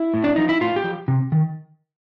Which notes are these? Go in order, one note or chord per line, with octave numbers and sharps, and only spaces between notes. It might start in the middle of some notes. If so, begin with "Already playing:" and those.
Already playing: E4
A2
D4
F3 D#4
E4
A2 F4
G4
F3
C3
D#3